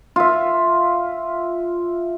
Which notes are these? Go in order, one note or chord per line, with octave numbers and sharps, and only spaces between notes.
F4 E5